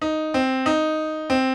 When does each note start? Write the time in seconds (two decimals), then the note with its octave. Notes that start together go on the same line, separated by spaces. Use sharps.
0.02 D#4
0.34 C4
0.66 D#4
1.30 C4